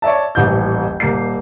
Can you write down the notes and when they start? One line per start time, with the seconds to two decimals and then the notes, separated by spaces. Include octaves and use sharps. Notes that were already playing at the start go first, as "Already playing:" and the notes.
0.02 C#5 D5 E5 A5
0.35 D#1 A1 E3 G6
1.00 D#1 A#3 C7